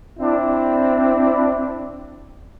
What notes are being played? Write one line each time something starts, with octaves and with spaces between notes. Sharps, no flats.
C4 D4 E4